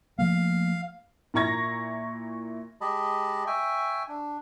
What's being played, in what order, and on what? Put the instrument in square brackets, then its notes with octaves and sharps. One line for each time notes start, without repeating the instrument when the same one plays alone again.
[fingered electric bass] F3 A3 A#3 [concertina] F5
[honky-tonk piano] A#2 E4 A#5 C#6 G#6 A#6
[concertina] G#3 G4 D#5 A5 B5
E5 G5 G#5 C#6
D4